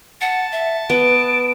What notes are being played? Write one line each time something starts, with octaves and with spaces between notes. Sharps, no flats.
F#5 A5
E5
B3 B4 D7